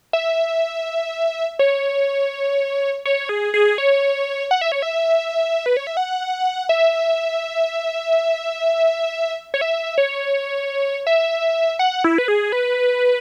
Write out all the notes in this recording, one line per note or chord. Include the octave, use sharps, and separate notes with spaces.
E5
C#5
C#5
G#4
G#4
C#5
F#5
E5
C#5
E5
B4
C#5
E5
F#5
E5
C#5
E5
C#5
E5
F#5
E4
B4
G#4
B4